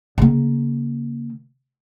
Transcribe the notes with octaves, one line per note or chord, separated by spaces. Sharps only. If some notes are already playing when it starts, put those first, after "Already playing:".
C#3 A#3